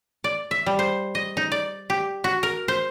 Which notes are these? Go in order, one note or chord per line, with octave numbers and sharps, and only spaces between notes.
D5
E5
G3
C5
D#5
D#4
D5
G4
F#4
A#4
C5